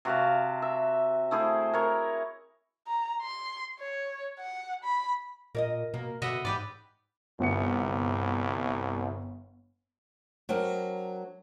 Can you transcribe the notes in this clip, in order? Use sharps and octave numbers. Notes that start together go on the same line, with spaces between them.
C3 F#4 F5 A5
E5
A3 E4 G#4 C5
A#4 C#5
A#5
C6
C#5
F#5
B5
A#2 A#4 D5 D#5
B2 A#3
B2 D3 B3 F#4 D#5 E5 F#5
G#2 G4 B4 D5
G1 C2 F#5 C#7
F#3 C4 D4 A#4